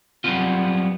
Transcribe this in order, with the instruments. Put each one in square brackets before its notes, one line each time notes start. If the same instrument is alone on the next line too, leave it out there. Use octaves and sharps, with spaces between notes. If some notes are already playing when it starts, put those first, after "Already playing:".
[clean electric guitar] F#3 G3 B3 C4 F4